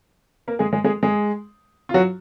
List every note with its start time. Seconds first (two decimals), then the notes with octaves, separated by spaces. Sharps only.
0.48 A#3 A#4
0.59 G#3 G#4
0.73 G#3 G#4
0.84 G#3 G#4
1.03 G#3 G#4
1.89 F4
1.94 F#3 F#4